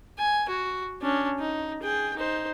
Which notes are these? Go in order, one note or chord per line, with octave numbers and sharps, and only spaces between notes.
G#5
F#4
C#4 D4
D#4
G#4 G5
D#4 C5